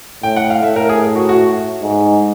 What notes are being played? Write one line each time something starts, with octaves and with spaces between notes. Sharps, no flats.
A2 G5
F#5
F5
A2 E5
A#4
G#4
F#4
F#4
G#2